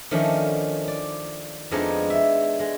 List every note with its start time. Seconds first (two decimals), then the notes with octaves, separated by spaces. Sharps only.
0.11 D#3 F3 A3 C#4 D4
0.88 D5
1.71 F2 F3 G#3 B3 D4 D#4
2.10 E5
2.60 G#3